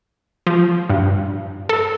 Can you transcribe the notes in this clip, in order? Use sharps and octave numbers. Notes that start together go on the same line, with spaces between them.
F3
G2
A4